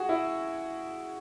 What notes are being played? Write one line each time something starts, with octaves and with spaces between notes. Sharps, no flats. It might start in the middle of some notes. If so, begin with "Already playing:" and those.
Already playing: F#4 G#4
E4